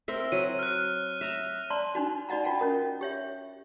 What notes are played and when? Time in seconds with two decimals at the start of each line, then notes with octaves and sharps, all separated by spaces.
0.08 C4 A#4 E5
0.32 F#3 D#7
0.59 F6 F#6
1.21 E5 A#5
1.70 D5 A5 A#5 C6
1.94 D4 D#4 F#4 A5
2.29 D#4 F#4 D5 D#5 F#5 A#5
2.43 F4 F#4 F#5 G5 A5
2.59 C#4 A#4 D#5
3.01 G4 C#5 E5